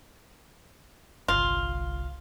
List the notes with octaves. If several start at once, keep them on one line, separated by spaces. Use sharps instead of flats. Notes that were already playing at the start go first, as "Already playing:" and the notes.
G1 C2 F4